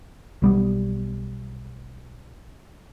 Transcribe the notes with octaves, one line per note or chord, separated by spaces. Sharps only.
B1 G3 B3